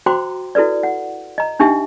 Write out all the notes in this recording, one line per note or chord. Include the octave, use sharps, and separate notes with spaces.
F#4 C5 G5 A#5 C6 D6
E4 F#4 A4 B4 D5
F#5
D#5 A#5
D4 D#4 G4 E5 G5